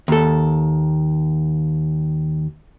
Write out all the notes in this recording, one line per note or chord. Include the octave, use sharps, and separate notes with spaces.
D#2 A4